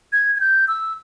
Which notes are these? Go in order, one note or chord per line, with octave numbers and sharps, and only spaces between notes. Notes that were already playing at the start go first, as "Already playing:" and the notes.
G#6
G#6
G6
E6